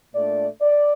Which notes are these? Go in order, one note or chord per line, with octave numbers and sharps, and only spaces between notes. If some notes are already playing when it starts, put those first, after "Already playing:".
A#2 A3 D4 D5
D5